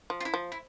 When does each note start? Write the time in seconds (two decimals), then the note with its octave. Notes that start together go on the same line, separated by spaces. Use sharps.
0.10 F3
0.20 F4
0.25 E4
0.34 F3
0.52 E4